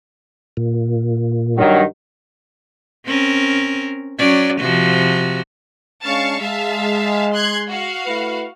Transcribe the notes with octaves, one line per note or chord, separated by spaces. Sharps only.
A#2
G2 D#3 F#3
C4 C#4 A#4
F#3 C#4 D5
C3 F3 F#4
G#3 C#4 D4 F5 A5 C#6
G#3 E5 F5 A5
C6 F#6 G#6
F#4 F5
A3 E4 B4